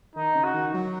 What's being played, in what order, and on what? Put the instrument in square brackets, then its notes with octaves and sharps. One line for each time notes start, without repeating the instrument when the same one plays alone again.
[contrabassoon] D#3 [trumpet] D#4
[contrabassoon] C#3
[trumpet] F#4
[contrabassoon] D#3
F#3